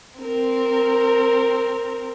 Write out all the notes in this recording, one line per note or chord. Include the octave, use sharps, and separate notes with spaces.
C4 A#4